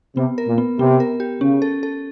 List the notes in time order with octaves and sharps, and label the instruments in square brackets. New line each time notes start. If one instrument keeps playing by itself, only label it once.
[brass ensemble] C3 [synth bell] B3
[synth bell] A#4
[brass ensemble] A#2
[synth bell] B3
[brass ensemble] C3 [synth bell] B3
[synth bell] A#4
G4
[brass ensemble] C#3 [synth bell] C#4
[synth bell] A4
A4